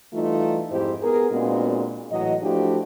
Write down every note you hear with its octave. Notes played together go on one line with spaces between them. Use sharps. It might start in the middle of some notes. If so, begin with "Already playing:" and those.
E3 G3 A3 D#4 F4
F2 G#2 E4 G4 C5
B3 G#4 A#4
A#2 G#3 B3 C4 D4 F#4
A2 E3 F#3 D#5
F3 A3 D4 E4 F#4 G4